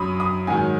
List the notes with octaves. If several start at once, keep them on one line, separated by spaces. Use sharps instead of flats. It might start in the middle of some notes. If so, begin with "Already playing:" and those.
Already playing: F#2 F#3 B5 D#6
B5 D#6
G#2 D#3 F#3 G#5